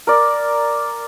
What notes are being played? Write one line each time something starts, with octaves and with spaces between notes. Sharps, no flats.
A#4 D5